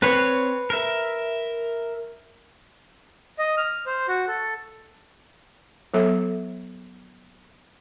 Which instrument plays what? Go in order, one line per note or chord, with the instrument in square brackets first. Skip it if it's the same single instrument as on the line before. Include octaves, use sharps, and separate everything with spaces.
[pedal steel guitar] C4 C#5 [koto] B4
[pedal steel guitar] A#4 E5
[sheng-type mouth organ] D#5
F6
C5
F#4
A4
[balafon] F#3 B3 A4 E5